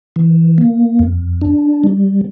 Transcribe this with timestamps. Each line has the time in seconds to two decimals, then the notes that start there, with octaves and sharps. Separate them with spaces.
0.16 E3
0.58 A#3
0.99 F2
1.41 D4
1.84 G3